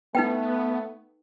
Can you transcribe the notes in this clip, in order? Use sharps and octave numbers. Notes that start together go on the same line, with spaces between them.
A3 B3 D#4 B4 G5